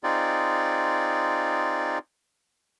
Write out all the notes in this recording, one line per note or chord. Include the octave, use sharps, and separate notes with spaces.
C4 D#4 F4 G#4 D5